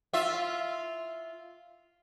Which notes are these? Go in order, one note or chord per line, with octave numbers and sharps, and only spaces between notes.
F4 E5